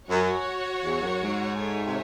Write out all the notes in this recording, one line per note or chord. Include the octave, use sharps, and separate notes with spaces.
F#2 F#4 C#5 F#5
E2
F#2
G#2
F#4 A4 C#5 E5 G#5
C3